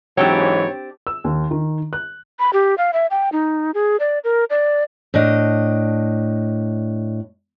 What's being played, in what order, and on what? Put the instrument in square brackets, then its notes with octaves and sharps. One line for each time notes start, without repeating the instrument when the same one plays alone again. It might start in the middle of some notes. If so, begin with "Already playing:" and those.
[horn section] G#2 E3 [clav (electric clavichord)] F#3 [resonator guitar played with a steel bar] C4 D4 G4 [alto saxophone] C#5
[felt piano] E6
D#2
D#3
F#6
[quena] B5
G4
F5
E5
G5
D#4
G#4
D5
A#4
D5
[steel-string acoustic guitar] A2 D4 D#5